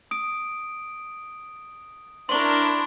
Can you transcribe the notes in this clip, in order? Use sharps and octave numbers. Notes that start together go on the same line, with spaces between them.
D#6 D7
D4 E4 A#4 C6 C#6